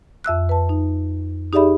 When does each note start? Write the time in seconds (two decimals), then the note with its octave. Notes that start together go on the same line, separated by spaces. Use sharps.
0.24 F2 E5 E6 F#6
0.49 B4 A5
0.69 D#4
1.53 D#4 G4 G#4 D5 E5 B5